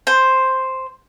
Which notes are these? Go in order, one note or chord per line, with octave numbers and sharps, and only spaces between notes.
C5